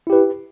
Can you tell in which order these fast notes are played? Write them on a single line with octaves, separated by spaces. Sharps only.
E4 G4 B4